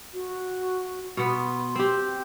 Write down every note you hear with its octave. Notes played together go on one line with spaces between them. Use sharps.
F#4
B2 B3 C6
C4 G4